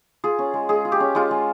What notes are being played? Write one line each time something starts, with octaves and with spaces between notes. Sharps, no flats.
F4 G#4
C#4
G#3
G#3 G#4
F4
G4
C#4
G#3 F4
G#3